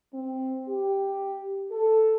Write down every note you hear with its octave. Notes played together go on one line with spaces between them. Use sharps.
C4
G4
A4